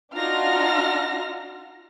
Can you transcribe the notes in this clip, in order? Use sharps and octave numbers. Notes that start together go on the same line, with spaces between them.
D4 D#4 F4 F#4 F6 A#6